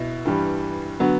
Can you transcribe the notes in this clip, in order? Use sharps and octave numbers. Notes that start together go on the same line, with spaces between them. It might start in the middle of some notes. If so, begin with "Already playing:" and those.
Already playing: B2 B3 E4
G2 E3 G3
D3 F#3 B3